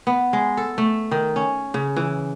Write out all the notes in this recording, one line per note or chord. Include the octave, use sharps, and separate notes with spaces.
B3
G#3
A4
A3
D#3
C#4
C#3
E3